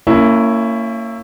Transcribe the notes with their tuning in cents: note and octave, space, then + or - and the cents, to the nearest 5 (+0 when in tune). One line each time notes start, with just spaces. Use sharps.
A#3 -30 C#4 +0 E4 +0